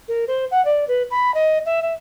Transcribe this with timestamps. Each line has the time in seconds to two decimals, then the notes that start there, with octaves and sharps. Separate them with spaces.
0.08 A#4
0.28 C5
0.51 F#5
0.65 D5
0.88 B4
1.11 B5
1.34 D#5
1.66 E5
1.82 E5